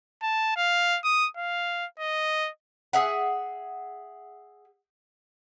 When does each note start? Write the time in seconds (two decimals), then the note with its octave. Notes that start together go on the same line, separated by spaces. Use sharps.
0.22 A5
0.56 F5
1.04 D#6
1.37 F5
1.99 D#5
2.93 G#4 E5 F#5